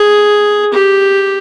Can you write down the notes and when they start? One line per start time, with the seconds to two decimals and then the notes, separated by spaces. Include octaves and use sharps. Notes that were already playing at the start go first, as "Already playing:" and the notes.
Already playing: G#4
0.73 G4